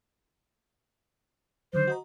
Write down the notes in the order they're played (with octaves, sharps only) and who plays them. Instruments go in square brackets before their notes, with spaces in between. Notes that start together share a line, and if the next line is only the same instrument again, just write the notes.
[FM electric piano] D3 D#3 F#3 [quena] C5
[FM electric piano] F#4 D#5 A#5